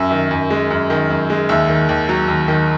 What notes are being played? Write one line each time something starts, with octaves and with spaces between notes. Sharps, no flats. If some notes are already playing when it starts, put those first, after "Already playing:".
Already playing: F#2 E5
D#3
F#2
G#3
F#2
D#3
F#2
G#3
D#2 E5
D#3
D#2
F#3
D#2
D#3